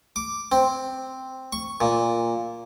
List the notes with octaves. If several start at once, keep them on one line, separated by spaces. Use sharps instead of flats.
D6
C4
C#6
A#2